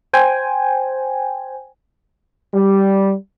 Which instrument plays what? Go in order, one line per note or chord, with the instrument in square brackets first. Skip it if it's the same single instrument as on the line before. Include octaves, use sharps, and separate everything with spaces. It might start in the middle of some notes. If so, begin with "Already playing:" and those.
[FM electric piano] C5 G5 G#5
[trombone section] G3